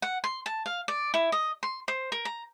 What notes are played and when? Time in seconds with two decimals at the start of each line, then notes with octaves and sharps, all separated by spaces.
0.02 F#5
0.24 C6
0.46 A5
0.66 F5
0.88 D5
1.14 E4
1.32 D#5
1.63 C6
1.88 C5
2.12 A#4
2.25 A#5